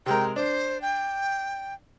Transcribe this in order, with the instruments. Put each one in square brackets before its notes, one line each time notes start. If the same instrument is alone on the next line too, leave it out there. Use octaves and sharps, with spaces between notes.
[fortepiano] C3 G#3 A#4 [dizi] G5
[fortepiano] D4 [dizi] C5
[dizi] G5